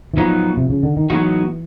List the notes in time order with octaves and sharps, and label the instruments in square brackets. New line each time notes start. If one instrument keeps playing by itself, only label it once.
[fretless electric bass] E3
[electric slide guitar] A2 F#3 B3 D#4 F#4 [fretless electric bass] F3
[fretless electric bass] C3
C#3
D3
D#3
[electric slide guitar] A2 F#3 B3 D#4 F#4 [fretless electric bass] E3